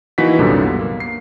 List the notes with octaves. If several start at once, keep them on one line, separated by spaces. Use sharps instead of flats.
E3 A#3 D#4 F#4 B6
C2 F#2 A#2 D3 G3
B3
A#3
C7